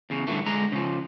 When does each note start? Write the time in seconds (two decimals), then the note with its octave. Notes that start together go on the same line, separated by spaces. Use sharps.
0.10 E2 C#3
0.27 G2 A#2 D3 E3 A3
0.46 D3 G#3 A#5
0.72 C#3 F3